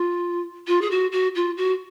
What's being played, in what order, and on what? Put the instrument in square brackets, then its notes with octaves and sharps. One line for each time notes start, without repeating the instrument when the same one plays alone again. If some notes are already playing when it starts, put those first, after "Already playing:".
Already playing: [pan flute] F4
F4
G#4
F#4
F#4
F4
F#4